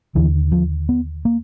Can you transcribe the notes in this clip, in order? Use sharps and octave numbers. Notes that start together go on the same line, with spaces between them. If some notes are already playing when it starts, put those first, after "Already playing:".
D#2 D3 E3
F3
B3
A#3